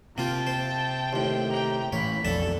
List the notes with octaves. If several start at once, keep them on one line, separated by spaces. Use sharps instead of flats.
C3 A#3 F4 G5 A5
C5
D#2 A2 C5
G4 G5 A#5
A2 E3 A#3 C#5 B5 B6
B1 F2 A#3 D4 A4 A5